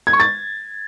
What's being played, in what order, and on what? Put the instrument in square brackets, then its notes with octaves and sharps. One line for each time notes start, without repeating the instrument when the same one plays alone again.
[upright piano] G#6
C#6
A6